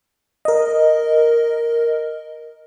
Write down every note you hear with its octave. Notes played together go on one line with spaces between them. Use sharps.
A#4 D#5